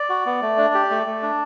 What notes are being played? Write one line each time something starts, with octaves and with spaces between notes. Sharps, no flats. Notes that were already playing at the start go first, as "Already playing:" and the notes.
Already playing: D5
F#4
B3
A3
D4
G4
A3
A3
D4